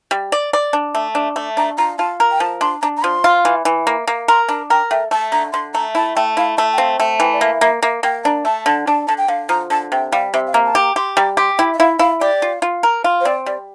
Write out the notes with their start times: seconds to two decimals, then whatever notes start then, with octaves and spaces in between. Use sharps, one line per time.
0.11 G3
0.32 D5
0.53 D5
0.73 D4
0.95 A3
1.15 D4
1.36 A3
1.57 D4 A#5
1.78 F4 A#5
1.98 F4 A5
2.20 A#4
2.31 G5
2.40 F3 A5
2.61 D4 C6
2.82 D4 A#5
2.97 A#5
3.03 F3 C6
3.24 F4
3.45 E3
3.65 E3
3.87 A#3
4.07 A#3 A#5
4.28 A#4 C6
4.48 D4 A#5
4.70 A#4 G5
4.90 A3 G5
5.11 A3 A5
5.32 D3 A#5
5.53 D3 C6
5.74 A3 A#5
5.95 E4 A5
6.16 A3 G5
6.37 E4 F5
6.57 A3 E5
6.73 G5
6.78 C4 F5
7.00 A3 G5
7.20 E3 G5
7.33 D5
7.41 A#3 E5
7.61 A#3 E5
7.82 A#3 E5
8.03 A#3 G5
8.24 D4 A#5
8.45 A3 A5
8.66 D3 A5
8.87 D4 A5
9.07 D3 A5
9.18 G5
9.28 D3 F5
9.49 F3 A#5
9.70 D3 A5
9.92 C3 G5
10.12 G3 F5
10.34 C3 E5
10.47 F5
10.53 A#3 E5
10.66 A5
10.74 G4 A#5
10.96 G4 C6
11.16 G3 A#5
11.37 G4 C6
11.58 E4 G5
11.74 E5
11.79 E4 F5
11.99 E4 F5
12.21 G4 D5
12.42 F4
12.62 F4
12.83 A#4
13.04 F4
13.21 C5
13.25 C4 D5
13.46 G3 D5